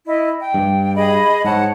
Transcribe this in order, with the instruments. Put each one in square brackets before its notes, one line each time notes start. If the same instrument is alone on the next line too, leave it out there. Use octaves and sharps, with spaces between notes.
[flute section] E4 D#5
G5
[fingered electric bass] G2
[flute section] G#4 D#5 B5
[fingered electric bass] G#2 [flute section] C#5 F#5 A5